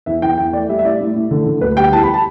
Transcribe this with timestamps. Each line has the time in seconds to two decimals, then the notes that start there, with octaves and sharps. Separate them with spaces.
0.06 E2 E5
0.22 E2 G5
0.38 E2 G5
0.53 A3 D5
0.69 G3 E5
0.79 E5
0.84 A2 D5
1.00 A2
1.16 A2
1.31 D3
1.46 D3
1.61 D2 B4
1.77 G3 G5
1.93 E2 A5
2.03 B5
2.14 A5